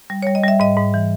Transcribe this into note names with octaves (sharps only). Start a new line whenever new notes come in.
G3
C#5
G3
D#5
G3 E5
G#2 D#5
G#2
E3